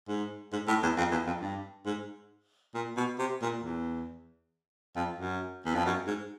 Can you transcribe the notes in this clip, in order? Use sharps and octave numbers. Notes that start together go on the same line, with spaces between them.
G#2
G#2
A2
E2
F2
E2
F2
G2
G#2
A#2
B2
C3
A#2
E2
F2
F#2
E2
F2
F#2
G#2